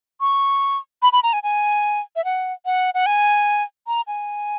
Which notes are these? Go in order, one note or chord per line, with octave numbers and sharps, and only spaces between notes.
C#6
B5
B5
A#5
G#5
G#5
E5
F#5
F#5
F#5
G#5
A#5
G#5